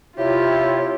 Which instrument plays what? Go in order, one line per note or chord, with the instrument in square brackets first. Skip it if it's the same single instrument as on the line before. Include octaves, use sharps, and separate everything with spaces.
[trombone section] C3 E4 [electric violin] F4 [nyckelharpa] G4 [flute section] C#5